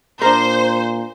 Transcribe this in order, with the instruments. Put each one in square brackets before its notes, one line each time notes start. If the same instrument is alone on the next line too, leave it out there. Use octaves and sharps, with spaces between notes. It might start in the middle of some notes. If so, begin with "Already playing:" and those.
[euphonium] A#2 [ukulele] D4 A#4 [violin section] C5